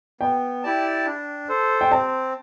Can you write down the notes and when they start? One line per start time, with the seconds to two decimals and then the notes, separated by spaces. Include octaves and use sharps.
0.21 B3 G5
0.63 E4 G4 D5 A5
1.06 D4
1.49 A4 C5
1.81 G5
1.91 C4 A5